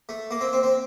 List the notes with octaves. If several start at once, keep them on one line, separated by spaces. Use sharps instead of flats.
A3
A#3
C4
C4
C4